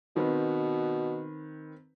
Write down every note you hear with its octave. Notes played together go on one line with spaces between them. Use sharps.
B2 D#3 C4 B4